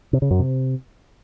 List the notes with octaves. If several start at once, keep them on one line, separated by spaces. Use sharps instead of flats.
C3
C#3
F#2
C3